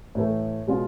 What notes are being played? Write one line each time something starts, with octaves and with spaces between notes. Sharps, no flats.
A2 E3 A3
B2 G#3 C#4 F4